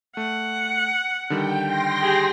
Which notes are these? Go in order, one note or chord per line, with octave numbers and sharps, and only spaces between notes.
A3 F#5
D3 D#3 G3 G5
G5 C6 A#6
G4 G#4